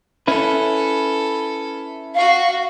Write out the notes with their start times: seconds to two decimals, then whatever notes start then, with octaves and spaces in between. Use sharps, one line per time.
0.27 C#4 E4 A4 B4
2.15 F#4 F5 C#6